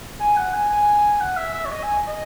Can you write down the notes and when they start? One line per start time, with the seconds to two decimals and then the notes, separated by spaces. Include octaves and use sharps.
0.20 G#5
0.37 F#5
0.54 G#5
0.69 G#5
1.20 F#5
1.37 E5
1.54 E5
1.65 C#5
1.71 D#5
1.83 G#5
2.08 D#5